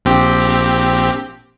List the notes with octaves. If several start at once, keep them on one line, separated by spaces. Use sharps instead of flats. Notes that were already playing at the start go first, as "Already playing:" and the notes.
A#1 C4 G4